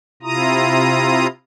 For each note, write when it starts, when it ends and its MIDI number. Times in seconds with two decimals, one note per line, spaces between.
0.23 1.27 48
0.23 1.27 64
0.23 1.27 65
0.23 1.27 82
0.23 1.27 87